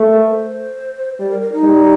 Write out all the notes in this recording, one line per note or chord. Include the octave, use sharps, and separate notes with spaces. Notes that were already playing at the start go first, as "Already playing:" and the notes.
Already playing: A3
A#4
C5
G3 D5
A#4
A#4
D#4
G3